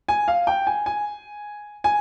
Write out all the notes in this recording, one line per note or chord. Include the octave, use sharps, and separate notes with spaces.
G#5
F5
G5
G#5
G#5
G#5